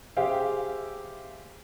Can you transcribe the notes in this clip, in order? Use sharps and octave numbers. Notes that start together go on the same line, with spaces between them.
G4 G#4 C5 E5 F5 G5